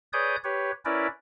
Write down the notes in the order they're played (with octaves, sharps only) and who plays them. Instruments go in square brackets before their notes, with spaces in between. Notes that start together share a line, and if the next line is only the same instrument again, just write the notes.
[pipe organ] G#4 B4 C#5 D5 D#6 G6
G4 B4 C#5
C#4 E4 A#4 B4 D5